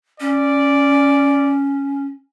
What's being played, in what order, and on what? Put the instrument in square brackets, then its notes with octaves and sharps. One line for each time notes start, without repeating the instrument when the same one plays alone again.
[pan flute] C#4 [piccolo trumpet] D5